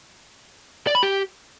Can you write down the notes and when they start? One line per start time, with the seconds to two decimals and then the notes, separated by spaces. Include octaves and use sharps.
0.87 D5
0.95 B5
1.03 G4